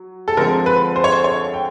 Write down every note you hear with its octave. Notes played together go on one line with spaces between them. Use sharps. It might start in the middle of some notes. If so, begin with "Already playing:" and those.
Already playing: F#3
A4
D3 F3 G#3 C4 A#4
B4
C5
C#5
C5
C#5
G5